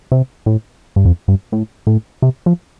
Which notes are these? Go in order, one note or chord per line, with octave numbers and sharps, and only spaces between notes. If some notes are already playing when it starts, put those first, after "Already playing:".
C3
A2
G2
F2
G2
A2
A2
C3
F3